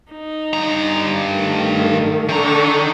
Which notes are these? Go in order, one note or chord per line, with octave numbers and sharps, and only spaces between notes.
D#4
G2 A#5
D#3 A3
D3 D#3 A#5 C#6